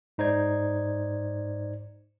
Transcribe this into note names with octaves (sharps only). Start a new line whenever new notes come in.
G#2 D#4 C5 D5 G#6